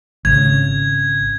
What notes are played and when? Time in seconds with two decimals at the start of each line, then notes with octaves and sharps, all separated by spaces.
0.25 G#1 C#3 G#6